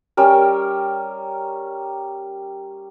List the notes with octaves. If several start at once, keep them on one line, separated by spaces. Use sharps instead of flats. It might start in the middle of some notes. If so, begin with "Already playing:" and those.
G3 C#4 A#4